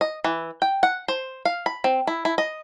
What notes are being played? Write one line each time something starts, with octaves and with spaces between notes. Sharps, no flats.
D#5
E3
G5
F#5
C5
F5
B5
C4
E4
E4
D#5